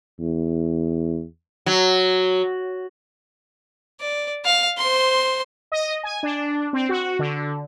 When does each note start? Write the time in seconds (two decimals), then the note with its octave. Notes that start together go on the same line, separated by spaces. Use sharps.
0.20 E2
1.66 F#3
4.01 D5
4.45 F5
4.78 C5 C6
5.72 D#5
6.03 G#5
6.23 D4
6.73 C4
6.89 F#4
7.19 D3